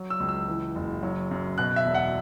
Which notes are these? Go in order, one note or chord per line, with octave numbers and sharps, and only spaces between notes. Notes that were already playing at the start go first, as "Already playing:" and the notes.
Already playing: F#3
E6
C#2
E6
E3
F#1
F#3
F#2
B2 F#6
E5
E1
F#5